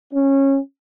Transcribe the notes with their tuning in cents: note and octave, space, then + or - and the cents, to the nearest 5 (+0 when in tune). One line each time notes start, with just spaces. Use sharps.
C#4 -20